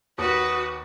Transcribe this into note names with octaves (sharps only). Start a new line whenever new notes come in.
D#2 F#4 B4 D#6